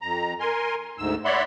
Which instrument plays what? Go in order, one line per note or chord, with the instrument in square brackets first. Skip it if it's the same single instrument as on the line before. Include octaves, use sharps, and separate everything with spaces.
[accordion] F2 A#5
A#4 G#5 C6
D2 G#2 E6
C#5 D5 E5 F#5 B5 C6